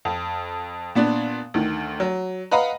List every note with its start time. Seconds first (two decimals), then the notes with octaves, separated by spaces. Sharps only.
0.05 F2
0.95 A#2 B3 D4
1.54 D2 D#3
2.00 F#3
2.51 B4 D#5 F5 F#5 A#5 B5